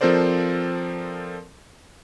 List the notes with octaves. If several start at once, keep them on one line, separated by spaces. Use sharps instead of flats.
F3 C4 A4 A#4 C5 D5